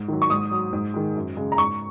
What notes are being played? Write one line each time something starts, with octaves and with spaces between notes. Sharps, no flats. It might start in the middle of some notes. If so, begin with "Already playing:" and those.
Already playing: G#2
D#3 F#3
C#6
G#2 D#6
F#3
G#2
D#3 G#3
F#2
C#3 G#3
A#5
G#2 C#6